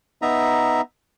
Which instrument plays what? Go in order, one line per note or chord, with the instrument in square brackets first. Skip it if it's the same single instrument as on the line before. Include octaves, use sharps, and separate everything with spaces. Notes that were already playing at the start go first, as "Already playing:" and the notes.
[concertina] B3 D#4 E5 A#5